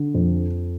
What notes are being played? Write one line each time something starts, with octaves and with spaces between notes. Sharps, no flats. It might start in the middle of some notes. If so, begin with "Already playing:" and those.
Already playing: D3
F2